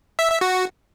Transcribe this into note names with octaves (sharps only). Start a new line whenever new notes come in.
E5
E5
F#4